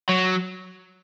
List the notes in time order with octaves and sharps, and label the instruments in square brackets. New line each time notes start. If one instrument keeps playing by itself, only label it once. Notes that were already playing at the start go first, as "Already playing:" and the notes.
[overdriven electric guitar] F#3